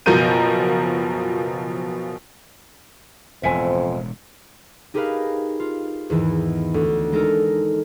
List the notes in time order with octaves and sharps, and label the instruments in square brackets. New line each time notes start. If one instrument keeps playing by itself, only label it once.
[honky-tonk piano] F#1 B2 F3 A#4 G6 D#7
[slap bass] E1 A2 [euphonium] F2 [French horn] C5 [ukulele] E5 G#5
[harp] D#4 G4 G#4 A#4 B4 F5
F4
E2 G#2 D#3 E3
D2
G#3 D#4 A4 A#4